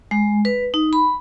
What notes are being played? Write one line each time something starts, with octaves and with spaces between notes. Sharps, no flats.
G#3
B4
D#4
B5